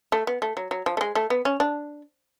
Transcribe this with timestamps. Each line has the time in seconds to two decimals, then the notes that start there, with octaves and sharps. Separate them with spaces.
0.12 A3
0.27 B3
0.42 A3
0.57 F#3
0.71 F#3
0.86 F3
0.97 A3
1.01 G#3
1.15 A3
1.30 B3
1.45 C#4
1.60 D4